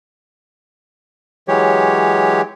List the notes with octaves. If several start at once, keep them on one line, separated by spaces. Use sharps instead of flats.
E3 F#3 G#3 G4 C#5